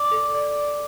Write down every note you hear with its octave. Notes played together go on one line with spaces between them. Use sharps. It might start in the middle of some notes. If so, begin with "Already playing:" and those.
Already playing: D5 D6
A4
D5